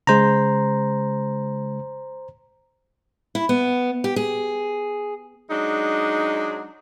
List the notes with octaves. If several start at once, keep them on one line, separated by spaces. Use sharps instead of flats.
C#3 G#3 C5 A#5
E4
B3
G4
G#4
F#3 G#3 D4 D#4